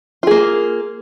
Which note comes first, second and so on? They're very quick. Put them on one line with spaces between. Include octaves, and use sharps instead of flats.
F4 G#4 A#3